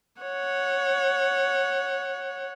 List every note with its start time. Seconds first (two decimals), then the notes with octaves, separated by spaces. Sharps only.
0.22 C#5 F#5